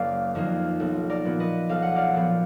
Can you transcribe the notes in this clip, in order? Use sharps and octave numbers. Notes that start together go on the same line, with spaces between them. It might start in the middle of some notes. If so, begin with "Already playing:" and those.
Already playing: F#1 A#3 D5 F5
F2 D#3 A#3 D#4
B1
A#4 D5
A#2 F3 B3
B4 D#5
B1 F5
F#5
D5 F5
A#2 F3 B3